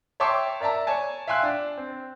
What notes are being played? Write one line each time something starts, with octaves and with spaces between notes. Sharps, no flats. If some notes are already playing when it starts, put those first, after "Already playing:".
C#5 E5 G5 A5 C6 D6
A#4 D5 E5 A5 A#5
C#5 D5 G#5 A5
E5 F5 G5 G#5 C6 F#6
D4
C4